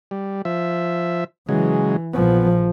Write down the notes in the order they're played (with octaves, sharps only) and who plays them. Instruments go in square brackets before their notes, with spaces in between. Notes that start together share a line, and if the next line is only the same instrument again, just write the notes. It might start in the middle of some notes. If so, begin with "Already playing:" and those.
[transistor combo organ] G3
F3 E5
[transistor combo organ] C#3 F#3 G#3 [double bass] E3
[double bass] A#1 F3 [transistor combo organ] B3